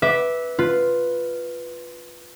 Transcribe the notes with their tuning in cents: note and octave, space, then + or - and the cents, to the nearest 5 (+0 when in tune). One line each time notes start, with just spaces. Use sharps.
B4 +0 E5 -15 D6 +0
F4 +0 B4 +0